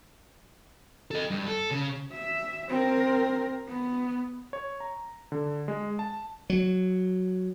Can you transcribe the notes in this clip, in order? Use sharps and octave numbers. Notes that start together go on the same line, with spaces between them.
A4 D#5
G2
A4
C#3
E5
C4 A#4
B3
C#5
A#5
D3
G#3
A5
F#3